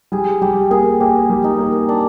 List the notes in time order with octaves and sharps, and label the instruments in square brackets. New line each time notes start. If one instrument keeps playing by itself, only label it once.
[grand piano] G3 [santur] G#4
[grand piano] G3 [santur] G4
[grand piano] A#3 [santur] G#4
[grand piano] A#3 [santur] G4
[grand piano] G3
[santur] D#4
[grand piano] A#3
[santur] D4